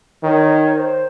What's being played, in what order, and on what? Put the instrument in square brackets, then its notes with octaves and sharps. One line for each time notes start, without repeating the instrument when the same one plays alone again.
[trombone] D#3 [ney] C#5
[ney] C5